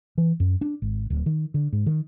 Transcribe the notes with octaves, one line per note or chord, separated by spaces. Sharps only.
E3
F#2
D4
G#1
D1
D#3
D3
G#2
D#3